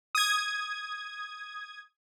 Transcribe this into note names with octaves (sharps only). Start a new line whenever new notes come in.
D#6 G#6